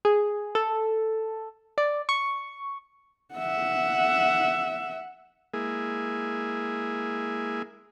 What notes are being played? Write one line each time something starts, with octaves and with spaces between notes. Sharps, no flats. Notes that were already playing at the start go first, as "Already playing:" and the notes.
G#4
A4
D5
C#6
E5 F#5
G#3 A#3 E4 G#4